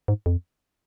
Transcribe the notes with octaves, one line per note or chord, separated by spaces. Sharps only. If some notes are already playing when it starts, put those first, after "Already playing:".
G#2
F2